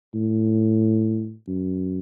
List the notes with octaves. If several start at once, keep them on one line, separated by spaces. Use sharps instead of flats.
A2
F#2